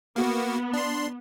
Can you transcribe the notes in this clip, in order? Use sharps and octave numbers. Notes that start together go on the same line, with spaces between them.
A#3 B3 F#4
D4 C6